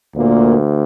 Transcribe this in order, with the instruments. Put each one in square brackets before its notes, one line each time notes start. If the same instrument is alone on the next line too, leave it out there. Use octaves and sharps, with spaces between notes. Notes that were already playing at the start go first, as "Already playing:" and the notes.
[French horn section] D2 A#2 A#3